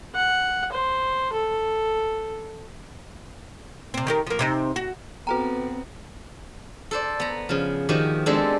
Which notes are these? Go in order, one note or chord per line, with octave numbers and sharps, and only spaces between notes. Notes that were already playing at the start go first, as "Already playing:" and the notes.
F#5
C5
A4
C3 C4
D#3 G4 A#4
F3 A#3
C3 C4 D#4
F#4
B3 C4 F#4 A4 B4 G5 A#5
A4 C5 D5
B3 A#5
C#3 F3
D#3 F3 F#4 G4
G#3 B3 C4 D4 G4 A4